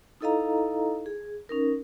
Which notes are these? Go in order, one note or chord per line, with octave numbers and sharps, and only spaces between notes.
D#4 E4 A4 D#5 F5 A#5
G#4
C#4 D#4 A#4